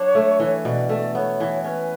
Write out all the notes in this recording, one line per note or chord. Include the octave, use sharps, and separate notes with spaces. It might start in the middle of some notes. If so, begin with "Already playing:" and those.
Already playing: F#3 D4 C#5
A3
E3
B2 D5
A3
B3 C#5
E3
C#4 B4